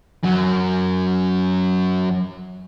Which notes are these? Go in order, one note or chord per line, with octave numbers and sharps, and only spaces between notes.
F#2 F#3